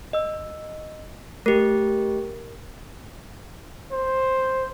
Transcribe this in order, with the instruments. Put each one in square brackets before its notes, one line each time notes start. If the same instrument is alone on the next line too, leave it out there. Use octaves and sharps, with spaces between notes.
[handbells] D#5 E6
[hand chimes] A3 G4 [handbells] A#4
[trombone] C5